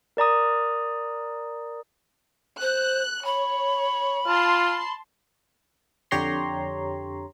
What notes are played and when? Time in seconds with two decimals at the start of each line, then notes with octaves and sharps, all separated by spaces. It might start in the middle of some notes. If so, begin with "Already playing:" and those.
0.17 A#4 D5 A#5 D#6
2.61 C5 F#6
3.25 C#5 B5
4.27 F4 A5 C6
6.11 F2 D3 G4 C#5 A#5 C6